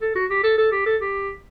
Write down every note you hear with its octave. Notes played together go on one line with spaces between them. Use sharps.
A4
F#4
G4
A4
A4
G4
A4
G4